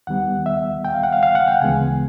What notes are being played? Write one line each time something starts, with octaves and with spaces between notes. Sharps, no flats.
D#2 D#3 G3 B3 F#5
E5
G5
F5
F#5
F5
F5
F#5
G5
D2 C#3 E3 G#3 B3 G#5